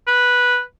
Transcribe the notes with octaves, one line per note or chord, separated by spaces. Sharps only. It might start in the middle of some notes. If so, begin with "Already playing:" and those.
B4